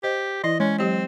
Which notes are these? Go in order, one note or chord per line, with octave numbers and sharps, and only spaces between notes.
G4 C5 D#5
E3 E4 D5 D#5
G#3 C#4 C#5
F#3 C4 G4 D#5